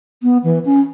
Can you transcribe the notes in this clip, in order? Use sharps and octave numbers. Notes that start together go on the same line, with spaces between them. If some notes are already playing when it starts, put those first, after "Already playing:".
B3
E3
C#4